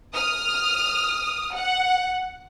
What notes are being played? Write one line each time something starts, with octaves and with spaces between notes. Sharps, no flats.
D#6 F6
F#5